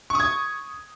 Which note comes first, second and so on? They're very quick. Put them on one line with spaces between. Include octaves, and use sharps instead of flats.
C#6 D#6 G#6